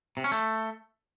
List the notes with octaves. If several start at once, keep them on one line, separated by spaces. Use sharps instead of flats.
C3
C#4
A3